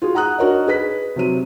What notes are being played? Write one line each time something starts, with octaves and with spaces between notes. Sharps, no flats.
F4 F#4 G#4
F#5 A#5 D#6 F#6
D4 F#4 A#4 C#5 D#5
G#4 B4 B6
C3 F#3 D#7